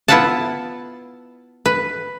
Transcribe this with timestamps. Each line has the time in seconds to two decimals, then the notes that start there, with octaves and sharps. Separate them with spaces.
0.08 B3 E4 F4 E5 F#5 A5
1.66 B4